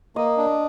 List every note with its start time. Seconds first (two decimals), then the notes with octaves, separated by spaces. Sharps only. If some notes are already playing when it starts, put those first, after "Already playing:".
0.16 A#3 D#5
0.37 D4